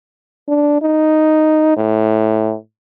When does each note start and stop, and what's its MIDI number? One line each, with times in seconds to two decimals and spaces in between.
0.48 0.82 62
0.82 1.73 63
1.77 2.55 45